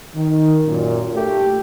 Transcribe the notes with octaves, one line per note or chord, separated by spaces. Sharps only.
D#3
F#2 A#2
A3 G4